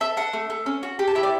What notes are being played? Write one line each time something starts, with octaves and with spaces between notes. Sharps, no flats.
A4 E5
D4 F#5
A3
A3
C#4
F#4
G4
A5
E4 E5
D5